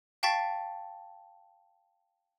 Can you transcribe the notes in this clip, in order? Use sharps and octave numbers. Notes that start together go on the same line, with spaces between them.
F5 G5 A5 C#6 A6 B6